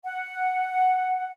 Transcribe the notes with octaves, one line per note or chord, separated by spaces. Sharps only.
F#5